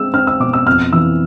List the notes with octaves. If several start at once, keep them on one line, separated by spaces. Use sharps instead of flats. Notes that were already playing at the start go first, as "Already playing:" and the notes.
Already playing: G#3 C4 E6
C4 F6
E6
B2 D6
E6
F2 F6
E3 E6